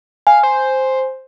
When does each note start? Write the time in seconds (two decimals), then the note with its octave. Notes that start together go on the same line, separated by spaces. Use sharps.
0.27 F5 G#5
0.43 C5